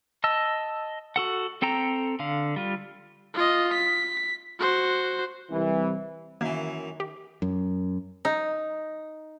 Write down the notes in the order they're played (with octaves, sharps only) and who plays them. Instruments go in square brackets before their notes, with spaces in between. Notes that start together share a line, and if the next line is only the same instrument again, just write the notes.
[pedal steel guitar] D#5 A5 E6
F#4 A4 F#5
C4 A4 G5 A#5
D3 F5
G3 F4
[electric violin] F4 D#5
B6
F#4 C5
[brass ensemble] C2 E3
[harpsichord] F#2 E3 [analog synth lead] D#3 [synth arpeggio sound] A#3
[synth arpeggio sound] G4
[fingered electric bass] F#2
[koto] D#4